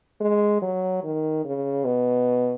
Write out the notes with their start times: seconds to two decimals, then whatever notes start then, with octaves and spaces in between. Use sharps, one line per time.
0.21 G#3
0.62 F#3
1.04 D#3
1.45 C#3
1.85 B2